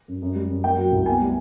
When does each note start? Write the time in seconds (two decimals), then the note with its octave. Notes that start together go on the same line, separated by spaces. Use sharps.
0.08 F#2
0.22 F#2
0.35 G3
0.50 F#2
0.64 A#3 G5
0.78 F#3
0.92 C2
1.06 B3 G#5
1.21 G3